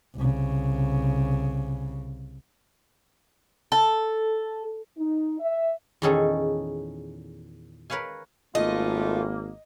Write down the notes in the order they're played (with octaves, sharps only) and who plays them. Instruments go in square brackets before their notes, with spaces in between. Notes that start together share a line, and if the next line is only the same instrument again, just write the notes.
[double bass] C2 C#3
[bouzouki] A4
[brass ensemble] D#4
E5
[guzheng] E2 A#2 D#3 C#4 G#4 A4
A#4 B4 C#5 F5 G#5
[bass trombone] G#1 [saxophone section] A3 F4 [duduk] A#3 [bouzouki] D#5